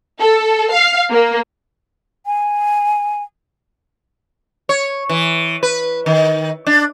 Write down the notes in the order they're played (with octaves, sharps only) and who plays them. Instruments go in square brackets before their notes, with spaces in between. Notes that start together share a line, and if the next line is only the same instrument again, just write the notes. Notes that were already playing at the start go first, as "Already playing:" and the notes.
[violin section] A4
F5
A#3
[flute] G#5
[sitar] C#5
E3
B4
D#3
D4